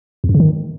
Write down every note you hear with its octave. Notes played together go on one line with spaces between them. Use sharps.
E2
F#2
C#3
D#3